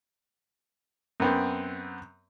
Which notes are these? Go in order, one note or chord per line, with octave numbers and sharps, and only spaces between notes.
F#2 B3 C4